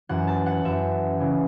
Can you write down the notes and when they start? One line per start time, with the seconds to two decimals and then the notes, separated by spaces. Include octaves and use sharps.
0.09 F#2 E3 F#5
0.27 A5
0.46 F#5
0.64 F#2 E3 E5
1.20 C#3 E3